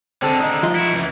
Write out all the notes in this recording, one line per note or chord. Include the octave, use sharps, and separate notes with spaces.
D3 G#3 C4 A4
D#4
F3 F4 D#5
E4 F#4
C#2 E3